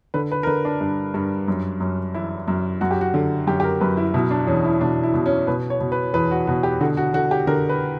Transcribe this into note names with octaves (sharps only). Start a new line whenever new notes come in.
D3 B4
B4
A#4
D3 B4
D4
G2
G2
F#2
F#2
E3 E4
F#2
F#2 F#4
G4
F#4
D3
F#2 G4
G4
A#4
F#2 B4
E4
B2 E4
D4
E2 C#4
E4
B2 D4
E4
B2
C#4
B2 B4
C#5
B2
B4
E2 B4
F#4
B2 F#4
G4
D3 F#4
F#4
D3 F#4
G4
D3 A#4
B4